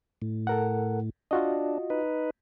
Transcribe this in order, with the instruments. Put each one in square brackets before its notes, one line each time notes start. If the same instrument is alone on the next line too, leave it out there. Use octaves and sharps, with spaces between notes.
[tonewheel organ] A2
[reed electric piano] A4 A#4 F#5
[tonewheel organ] D4 [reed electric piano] F4 F#4 D#5
[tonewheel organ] D#4 B4